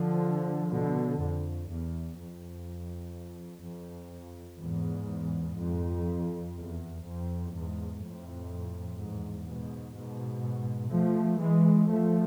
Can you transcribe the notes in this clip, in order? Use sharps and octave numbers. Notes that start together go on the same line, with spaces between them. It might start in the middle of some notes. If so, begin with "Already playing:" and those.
Already playing: D3 F3
B2 D3
F2
E2
F2
F2
E2 G#2
F2
E2
F2
E2 G#2
F2 A2
E2 G#2
G#2 B2
G#2 B2
F3 A3
E3 G#3
F3 A3